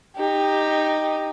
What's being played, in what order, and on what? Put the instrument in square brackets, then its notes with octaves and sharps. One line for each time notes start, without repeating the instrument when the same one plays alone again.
[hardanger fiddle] D#4 G4